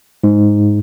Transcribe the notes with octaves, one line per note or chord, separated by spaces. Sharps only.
G#2